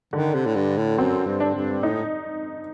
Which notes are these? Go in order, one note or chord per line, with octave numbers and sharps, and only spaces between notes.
D3 D#3
C3
A2
G2
A2
F#2 C4
G2
D4
G2
A2 D#4